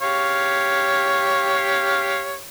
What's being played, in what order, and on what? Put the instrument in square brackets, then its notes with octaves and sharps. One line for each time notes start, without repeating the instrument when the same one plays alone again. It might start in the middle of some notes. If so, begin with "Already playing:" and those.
[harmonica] G4 C#5 F5